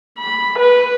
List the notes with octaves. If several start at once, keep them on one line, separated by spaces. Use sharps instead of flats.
B5
B4